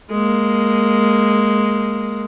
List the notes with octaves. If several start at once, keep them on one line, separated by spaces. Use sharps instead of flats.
G#3 A#3